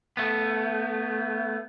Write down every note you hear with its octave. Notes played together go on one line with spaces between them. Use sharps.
A3 B3